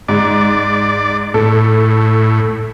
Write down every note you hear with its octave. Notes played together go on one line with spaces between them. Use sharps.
G#2 D5
A2 A4